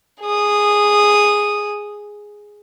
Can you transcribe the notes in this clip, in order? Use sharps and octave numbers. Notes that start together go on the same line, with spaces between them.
G#4 D#6